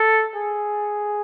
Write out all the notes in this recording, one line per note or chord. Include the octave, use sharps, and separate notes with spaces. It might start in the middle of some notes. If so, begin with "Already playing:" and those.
Already playing: A4
G#4